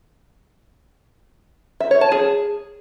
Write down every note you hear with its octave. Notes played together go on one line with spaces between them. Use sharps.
E5
C#5
A5
G#4